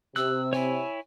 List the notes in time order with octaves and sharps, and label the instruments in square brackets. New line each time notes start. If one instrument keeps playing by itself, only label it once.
[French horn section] C3 [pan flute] E6 [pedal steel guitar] F#6
[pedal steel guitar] E4 C#5 [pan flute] G#5